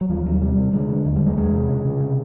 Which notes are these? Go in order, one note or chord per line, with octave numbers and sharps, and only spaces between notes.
F#3
D#2 F3
D#2 F#3
C3 G3
C3
D3 G#3
D3
D#2 G#3
G3
D#2 G#3
E2 G#3
C3
C#3
C#3
C3